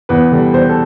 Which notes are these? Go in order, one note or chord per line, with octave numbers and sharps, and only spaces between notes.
E2 B4
D3 G3
E2 C5
A4